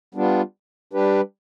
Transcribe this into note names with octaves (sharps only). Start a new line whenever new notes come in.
G3 B3 D4 F4
G3 D4 G4 B4